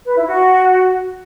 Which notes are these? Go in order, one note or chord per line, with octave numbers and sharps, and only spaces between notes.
B4
E4
F#4